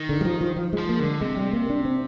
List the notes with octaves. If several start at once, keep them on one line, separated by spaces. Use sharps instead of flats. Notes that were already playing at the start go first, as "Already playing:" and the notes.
Already playing: D#3
D3
G3
F3
F3
F3
G#3
F3
A#3
D3 G#3
C3 G#3
G3
A#3
D4
C4